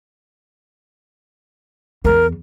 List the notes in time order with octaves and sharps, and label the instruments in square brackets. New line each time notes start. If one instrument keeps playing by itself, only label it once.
[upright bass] E2 [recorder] A#4